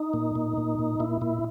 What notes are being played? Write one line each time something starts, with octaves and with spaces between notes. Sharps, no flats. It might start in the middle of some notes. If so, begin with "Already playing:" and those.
Already playing: D#4
A#2
A#2
A#2
A#2
A#2 E4
A#2 E4